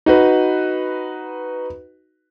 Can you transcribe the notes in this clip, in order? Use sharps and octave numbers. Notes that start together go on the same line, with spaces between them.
D#4 F#4 B4